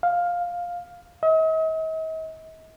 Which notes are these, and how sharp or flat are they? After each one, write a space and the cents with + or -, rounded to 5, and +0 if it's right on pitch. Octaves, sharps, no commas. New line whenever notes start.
F5 +10
D#5 +45